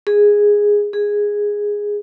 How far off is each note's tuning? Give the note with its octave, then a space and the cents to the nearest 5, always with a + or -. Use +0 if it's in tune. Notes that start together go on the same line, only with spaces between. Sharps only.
G#4 -5
G#4 -5